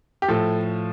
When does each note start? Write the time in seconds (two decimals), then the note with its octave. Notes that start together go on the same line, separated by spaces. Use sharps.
0.22 G4
0.28 A2 F3 A4